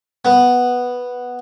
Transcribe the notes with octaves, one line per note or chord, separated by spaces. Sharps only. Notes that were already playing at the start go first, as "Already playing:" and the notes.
B3